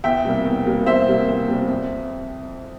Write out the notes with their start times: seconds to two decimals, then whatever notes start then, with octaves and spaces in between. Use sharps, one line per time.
0.04 E2 E5 G5
0.25 C3 G3 A#3
0.46 E2
0.66 C3 G3 A#3
0.86 E2 C5 E5
1.07 C3 G3 A#3
1.28 E2
1.48 C3 G3 A#3
1.69 F2